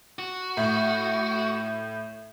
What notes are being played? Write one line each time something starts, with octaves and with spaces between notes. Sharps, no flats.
F#4
A2